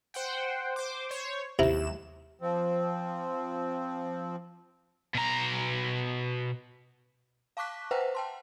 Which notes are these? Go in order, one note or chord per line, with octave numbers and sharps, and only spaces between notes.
C5 F#5 G5
C5 D6
C5 C#5
D#2 C3 E4 A#5 E7
F3 C4
B2 A#5
F5 A5 C#6 D6 F#6 B6
B4 C5 E5 F#5 G5 A#5
G5 A5 C6